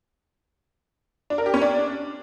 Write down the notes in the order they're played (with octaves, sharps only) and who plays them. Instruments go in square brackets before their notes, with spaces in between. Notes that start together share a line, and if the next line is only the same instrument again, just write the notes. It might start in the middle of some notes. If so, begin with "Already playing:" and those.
[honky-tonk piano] D4
A#4
G4
C#4
D4